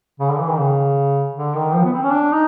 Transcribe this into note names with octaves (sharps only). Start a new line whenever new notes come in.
C#3
D3
E3
D#3
C#3
D3
D#3
F3
B3
C4
C#4
D4
D#4